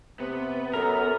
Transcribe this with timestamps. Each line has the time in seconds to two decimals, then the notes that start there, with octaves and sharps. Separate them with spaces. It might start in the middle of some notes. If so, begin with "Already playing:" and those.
0.20 C3 B3
0.73 F#2 A4 A#4